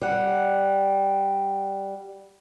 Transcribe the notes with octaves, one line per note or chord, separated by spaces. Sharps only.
G3 F#5